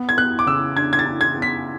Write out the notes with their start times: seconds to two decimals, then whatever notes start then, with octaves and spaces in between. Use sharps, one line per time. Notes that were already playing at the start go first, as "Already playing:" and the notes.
Already playing: B3
0.09 G#6
0.18 B3 F#6
0.39 D6
0.47 C#3 E6
0.76 D4 G#6
0.93 G#6
0.99 A6
1.06 D4
1.21 G#6
1.35 B3
1.42 B6